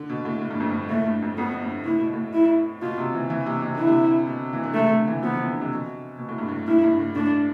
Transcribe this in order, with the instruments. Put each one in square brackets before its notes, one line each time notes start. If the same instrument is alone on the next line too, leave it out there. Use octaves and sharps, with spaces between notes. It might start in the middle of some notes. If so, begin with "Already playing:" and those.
Already playing: [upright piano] D3
B2
A2
A2
G2
F2
G2
[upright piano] A2 [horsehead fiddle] A3
[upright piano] G2
F2
[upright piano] F2 [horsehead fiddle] B3
[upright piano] G2
[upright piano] A2 [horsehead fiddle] E4
[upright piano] B2
A2
[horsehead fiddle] E4
[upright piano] B2 [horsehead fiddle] F4
[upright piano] C3
E3
E3
C3
C3
[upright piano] D3 [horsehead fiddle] E4
[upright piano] C3
B2
E3
D3
[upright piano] C3 [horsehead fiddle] A3
[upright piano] D3
E3
[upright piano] F3 [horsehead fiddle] B3
[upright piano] E3
D3
C3
B2
B2
A2
G2
A2
[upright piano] G2 [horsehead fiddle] E4
[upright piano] G2
A2
[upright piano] A2 [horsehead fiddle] D4